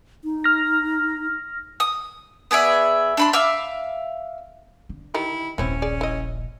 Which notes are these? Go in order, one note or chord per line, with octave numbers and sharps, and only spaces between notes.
D#4
F6 A#6
D#6
B3 G#4 D5 E5
D4 B5 C6
E5 F5 D6 E6
D3
D#3 D#4 E4 G4
D#1 A#1 E3 C4 C#4 E4
G#4 D5
E4 D#5